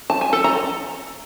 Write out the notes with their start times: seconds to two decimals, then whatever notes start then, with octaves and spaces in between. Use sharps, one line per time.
0.10 A5
0.21 G#5
0.33 A4
0.44 A#5